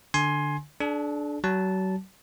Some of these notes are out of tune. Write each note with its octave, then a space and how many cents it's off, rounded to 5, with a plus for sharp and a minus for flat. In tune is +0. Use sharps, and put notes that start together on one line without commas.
D3 +0 G#5 +10 C6 +15
D4 +0 A4 -45
F#3 +35 A5 -10